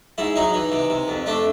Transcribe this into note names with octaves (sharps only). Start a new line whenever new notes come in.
G#2 E4
F#3 D#4
E3
C3
C3
F2
A3 D4